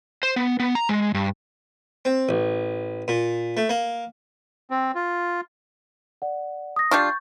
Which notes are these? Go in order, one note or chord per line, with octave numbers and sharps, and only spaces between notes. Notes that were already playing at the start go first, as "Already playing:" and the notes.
C5
B3
B3
A#5
G#3
G2
C4
A1
A#2
A3
A#3
C4
F4
D5 F#5
D#6 A#6
G3 D4 F4 C#6 G6 A6